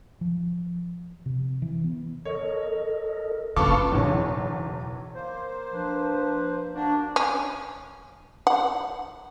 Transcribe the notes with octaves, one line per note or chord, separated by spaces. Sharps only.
F3
C3
E3
B3
A4 A#4 C#5 D#5
F#1 C#3 F4 A4 B4 C#6 D6
F#1 B1 E2
A#3 C5
F3 D4 B4
A#3 D4 F#4
C#4
F#5